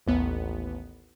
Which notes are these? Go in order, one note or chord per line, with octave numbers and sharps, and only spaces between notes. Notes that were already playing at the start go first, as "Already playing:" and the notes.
A1 D#2 B3